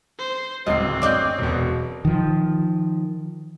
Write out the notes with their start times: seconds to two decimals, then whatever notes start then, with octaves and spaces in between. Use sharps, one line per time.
0.19 C5
0.66 D1 C#2 C4 D#5 C7
1.02 F#2 D5 D#5 D6 F#6 G6
1.39 E1 B2
2.05 D#3 F3